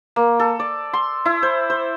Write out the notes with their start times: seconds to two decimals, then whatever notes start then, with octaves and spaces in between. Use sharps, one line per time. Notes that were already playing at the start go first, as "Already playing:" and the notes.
0.16 A#3
0.39 A4
0.59 D5
0.93 C6
1.25 E4
1.43 C5
1.70 C5